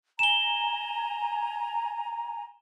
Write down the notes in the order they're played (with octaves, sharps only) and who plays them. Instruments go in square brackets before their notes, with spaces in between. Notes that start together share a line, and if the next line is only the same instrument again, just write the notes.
[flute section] G#5 A#5 [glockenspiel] E7 G7